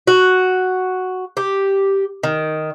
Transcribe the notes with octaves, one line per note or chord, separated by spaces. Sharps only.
F#4
G4
D#3